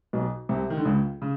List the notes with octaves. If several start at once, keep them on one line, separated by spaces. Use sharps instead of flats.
B1 B2
C2 C3
D#3
D3
C#2 C#3
C#3